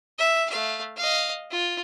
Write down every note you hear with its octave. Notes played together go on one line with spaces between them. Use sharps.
E5
A3 F5
D#5 F5
F4